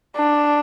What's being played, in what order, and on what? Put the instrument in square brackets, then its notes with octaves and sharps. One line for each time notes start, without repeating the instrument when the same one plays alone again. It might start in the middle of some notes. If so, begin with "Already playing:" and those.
[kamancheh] D4